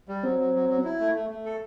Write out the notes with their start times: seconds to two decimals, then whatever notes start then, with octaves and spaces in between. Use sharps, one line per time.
0.08 G3
0.23 F#3 C4
0.39 F#3
0.54 F#3
0.69 F#3
0.85 E4
1.00 A3
1.15 A3
1.30 A3
1.46 A4